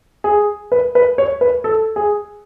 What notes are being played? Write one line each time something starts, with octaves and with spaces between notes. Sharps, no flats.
G#4
B4
B4
C#5
B4
A4
G#4